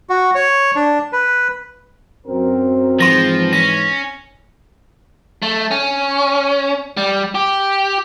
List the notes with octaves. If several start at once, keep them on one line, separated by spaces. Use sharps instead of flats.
F#4
C#5
D4
B4
F#2 C4 A#4
G#2 E3 F3 C6 A#6
C#4 A#6
A3
C#4
G3
G4